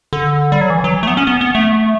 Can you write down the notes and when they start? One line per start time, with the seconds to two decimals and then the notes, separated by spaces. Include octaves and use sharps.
0.13 D3
0.52 G3
0.61 F#3
0.70 E3
0.84 F#3
1.03 A3
1.07 B3
1.17 C#4
1.27 B3
1.41 B3
1.55 A3